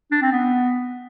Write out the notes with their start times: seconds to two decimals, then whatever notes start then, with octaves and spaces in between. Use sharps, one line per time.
0.11 D4
0.22 C4
0.32 B3